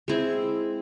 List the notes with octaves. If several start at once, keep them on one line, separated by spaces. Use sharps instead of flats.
G#3 C4 E4